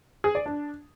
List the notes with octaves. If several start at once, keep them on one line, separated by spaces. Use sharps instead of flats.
G#4
D5
D4